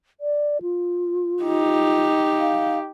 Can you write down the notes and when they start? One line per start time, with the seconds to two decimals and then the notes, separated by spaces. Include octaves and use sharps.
0.20 D5
0.62 F4
1.43 D#4 G4
2.39 F5